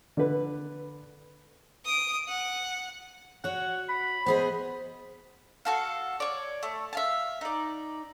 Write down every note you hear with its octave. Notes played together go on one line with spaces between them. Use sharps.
D3 B4
D#6 D7
F#5
F#4 C#5 F#5
B5
B3 G#4 C5 D#5
F#4 A4 F5
C#5 D5
A3
E5 F5 A5
D#4 D5